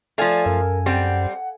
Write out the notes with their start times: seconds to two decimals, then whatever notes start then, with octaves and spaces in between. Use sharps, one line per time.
0.18 F3 A3 A4 D5 F5 G#5
0.46 F#2 A#4
0.86 G3 C4 F#5